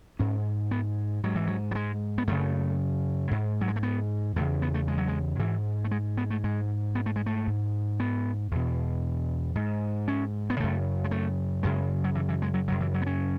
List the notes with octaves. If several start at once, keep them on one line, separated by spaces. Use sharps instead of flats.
G#2 C#4
B3
G#2 F#3
E3
F#3
F#3
G#3
B3
F#2 C#3 A3
G#2
F#3
G#3
A3
B3
E2 C#3 A3
B3
A3
G#3
F#3
G#3
G#2 E3
A3
G#3
B3
A3
G#2 G#3
B3
A3
G#3
A3
G#2
B3
E2 B2
G#2
C#4
B3
F#2 C#3 A3
G#3
A3
F#2 C#3 G#3
F#3
E3
E3
G#3
F#3
F#2 C#3 F#3
E3
F#3
B3
C#4